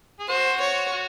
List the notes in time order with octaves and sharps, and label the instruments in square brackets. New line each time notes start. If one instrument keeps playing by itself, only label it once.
[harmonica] G#4
[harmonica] F#4 [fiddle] C5
[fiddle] C#5
[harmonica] F#4